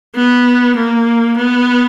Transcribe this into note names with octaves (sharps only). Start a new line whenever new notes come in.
B3
A#3
B3